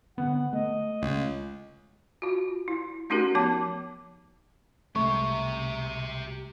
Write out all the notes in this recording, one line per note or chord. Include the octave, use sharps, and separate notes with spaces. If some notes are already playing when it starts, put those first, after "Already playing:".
D3 B3 F#5
A3 D#5
C#2
F4 F#4
E4
A3 C#4 D#4 F#4 G4 A#4
F3 B3 A5 D6
C2 G#3 A3 G4 E5 C#6